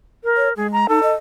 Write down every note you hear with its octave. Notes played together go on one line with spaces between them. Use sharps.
A#4
C#5
G#3 G#4
A#5
D#4 A4
D#5